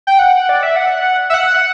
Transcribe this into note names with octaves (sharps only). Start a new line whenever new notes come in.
G5
F#5
D5
E5
F#5
E5
F#5